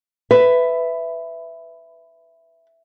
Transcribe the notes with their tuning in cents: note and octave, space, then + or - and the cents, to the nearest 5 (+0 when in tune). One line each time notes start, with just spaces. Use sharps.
B4 +15 E5 +5